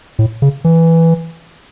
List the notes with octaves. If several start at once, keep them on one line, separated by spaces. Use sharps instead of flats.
A2
C#3
E3